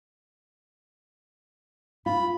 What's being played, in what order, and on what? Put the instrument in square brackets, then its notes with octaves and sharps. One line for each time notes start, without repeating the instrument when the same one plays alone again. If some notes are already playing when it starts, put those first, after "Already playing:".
[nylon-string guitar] F4 [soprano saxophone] B5